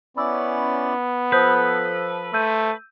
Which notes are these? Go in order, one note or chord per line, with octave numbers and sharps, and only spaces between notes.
B3 C#4 E4 D5 B5 E6
F3 A4 B4 C5 D#6 G6
A3 C5 E6 G6 D#7